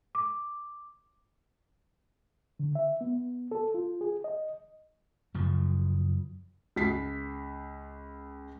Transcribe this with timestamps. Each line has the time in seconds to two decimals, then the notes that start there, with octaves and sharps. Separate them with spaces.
0.15 D6
2.60 D3
2.75 E5
3.01 B3
3.51 A4
3.74 F4
4.01 G#4
4.24 D#5
5.34 F#2 C#3 F3
6.76 C#2 B6 C7